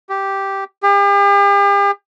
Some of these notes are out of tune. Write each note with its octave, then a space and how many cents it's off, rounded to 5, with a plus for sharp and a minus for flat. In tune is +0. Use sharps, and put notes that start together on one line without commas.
G4 -5
G4 +45